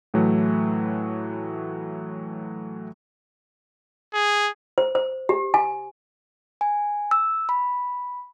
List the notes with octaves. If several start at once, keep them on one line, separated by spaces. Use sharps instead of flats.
A2 E3 F#3 A3
G#4
C5
C5
G4
G#5
G#5
E6
B5